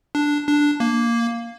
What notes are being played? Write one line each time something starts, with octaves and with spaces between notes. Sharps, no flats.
D4
D4
A#3